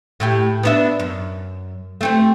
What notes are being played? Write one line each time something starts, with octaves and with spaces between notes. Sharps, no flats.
A2 E4 G4
B3 D4 E5
F#2
A3 C4 G4